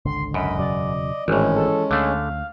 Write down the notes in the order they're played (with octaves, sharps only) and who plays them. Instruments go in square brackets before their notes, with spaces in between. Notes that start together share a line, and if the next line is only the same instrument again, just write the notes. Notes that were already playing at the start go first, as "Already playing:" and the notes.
[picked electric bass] G#1 C#2 D3 [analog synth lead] C6
[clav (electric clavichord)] F#2 [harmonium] D#5 [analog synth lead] B5
[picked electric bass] E1 C#3 F#3 [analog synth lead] D5
[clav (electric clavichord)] G#1 A2 [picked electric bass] E3 [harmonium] G#3 C#4
[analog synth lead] A4
[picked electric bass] D2 [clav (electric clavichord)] D3 A3 [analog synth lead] F5